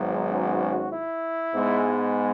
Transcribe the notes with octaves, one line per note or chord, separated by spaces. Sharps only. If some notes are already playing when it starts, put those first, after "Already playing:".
Already playing: G#1 G#2 F#3 B3
C#4 F#4
E4
G#2 G#3 B3